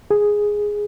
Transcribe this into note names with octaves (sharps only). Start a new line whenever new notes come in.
G#4